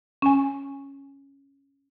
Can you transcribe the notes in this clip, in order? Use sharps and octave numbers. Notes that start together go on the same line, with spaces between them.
C#4 G#5